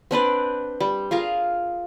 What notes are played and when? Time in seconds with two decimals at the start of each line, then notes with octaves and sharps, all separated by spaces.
0.11 C4 D4 B4 D5
0.80 G3
1.11 F4 G#4 A#4 F5